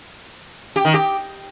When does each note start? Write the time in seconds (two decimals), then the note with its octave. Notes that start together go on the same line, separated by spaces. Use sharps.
0.76 G4
0.85 D#3
0.94 G4